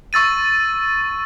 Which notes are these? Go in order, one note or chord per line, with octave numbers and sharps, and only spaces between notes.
C#6 E6 A6 D#7